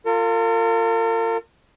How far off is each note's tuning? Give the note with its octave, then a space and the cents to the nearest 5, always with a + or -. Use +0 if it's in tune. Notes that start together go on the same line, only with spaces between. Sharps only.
F4 +0 A#4 -45